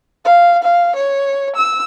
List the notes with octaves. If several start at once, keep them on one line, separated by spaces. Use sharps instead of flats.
F5
F5
C#5
E6